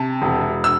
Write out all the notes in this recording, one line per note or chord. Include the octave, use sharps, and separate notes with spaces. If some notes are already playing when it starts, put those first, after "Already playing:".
Already playing: C3 A5
E1
E6